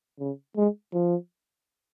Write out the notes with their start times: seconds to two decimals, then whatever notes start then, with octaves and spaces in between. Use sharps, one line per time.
0.20 C#3
0.56 G#3
0.93 F3